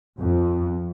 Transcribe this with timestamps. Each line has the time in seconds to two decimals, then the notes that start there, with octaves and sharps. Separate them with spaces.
0.20 F2